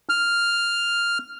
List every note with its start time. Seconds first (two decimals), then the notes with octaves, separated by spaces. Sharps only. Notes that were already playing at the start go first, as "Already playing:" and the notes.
0.09 F6